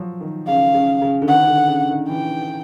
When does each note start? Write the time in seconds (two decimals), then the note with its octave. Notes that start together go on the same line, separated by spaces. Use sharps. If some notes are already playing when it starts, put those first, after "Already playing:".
Already playing: F3 F#3
0.21 D#3
0.47 C#3 F5
0.74 C#3
1.02 C#3
1.22 D3
1.28 D#3 F#5
1.48 D3
1.68 C#3
1.89 D#3
2.09 E3 G5